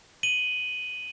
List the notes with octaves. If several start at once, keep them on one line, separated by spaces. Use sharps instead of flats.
D#7 F#7 G7